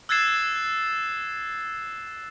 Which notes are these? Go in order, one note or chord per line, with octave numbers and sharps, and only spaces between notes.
E6 F#6 G#6 A6 C7 E7